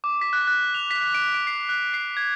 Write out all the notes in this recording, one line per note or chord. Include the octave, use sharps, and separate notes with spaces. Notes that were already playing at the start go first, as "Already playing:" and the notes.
D6
B6
F#6
F#6
F7
B6
D7
D7
C7
F#6
C7
G#6